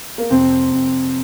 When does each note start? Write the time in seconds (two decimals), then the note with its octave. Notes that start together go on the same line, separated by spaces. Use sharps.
0.18 A#3
0.30 F2 C3 C4
0.72 F2